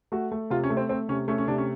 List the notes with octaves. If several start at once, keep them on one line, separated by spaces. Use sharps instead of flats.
A3 F#4
A3
C3 F4
C#4
A3
C4
A3 C4
C3 C#4
A3 C#4
C#4
C3 D4
C#4